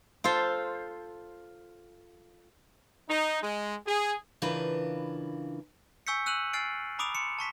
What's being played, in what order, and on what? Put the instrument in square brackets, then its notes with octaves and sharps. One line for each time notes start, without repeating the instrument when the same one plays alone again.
[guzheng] F4 A4 C5
[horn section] D#4
G#3
G#4
[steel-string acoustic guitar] C#3 E3 D4 F4 A#4 B4
[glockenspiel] G#5 C#6 E6 G6 B6 C#7
E6 F#6 D#7 F7 F#7
G#5 F6 A6 C7 D7
A#5 B5 D6 D#6 D7 F7
C6 D#6 C#7 E7
A5 C#6 B6 E7